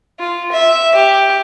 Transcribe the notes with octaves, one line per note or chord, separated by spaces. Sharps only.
F4
E5
G4